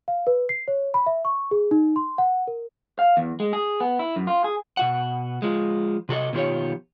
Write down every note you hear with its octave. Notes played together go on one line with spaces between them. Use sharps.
F5
B4
C7
C#5
B5
E5
C#6
G#4
D#4
C6
F#5
A#4
F5
E2
G#3
G#4
B3
E4
F#2
F4
G#4
B2 F#4 F#5
F3 G#3
C3 F#4 A4 D#5
B2 D#3 F3 E4 G4 C#5